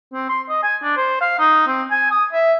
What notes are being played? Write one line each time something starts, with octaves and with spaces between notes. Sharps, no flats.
C4
C6
D#5
G#5
D4
C5
F5
D#4
C4
G#5
D#6
E5